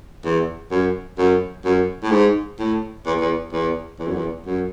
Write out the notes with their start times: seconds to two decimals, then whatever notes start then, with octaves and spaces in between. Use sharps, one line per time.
0.24 E2
0.71 F#2
1.18 F#2
1.65 F#2
2.03 A2
2.12 G#2
2.59 A2
3.06 E2
3.20 E2
3.53 E2
3.99 E2
4.07 F#2
4.15 E2
4.46 F#2